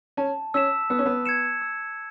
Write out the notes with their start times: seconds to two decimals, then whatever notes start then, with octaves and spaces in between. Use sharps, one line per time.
0.17 C#4 A5
0.54 C#4 E6 B6 E7
0.90 B3 E6
0.99 C#4
1.06 B3
1.26 G#6 C#7 E7
1.62 E6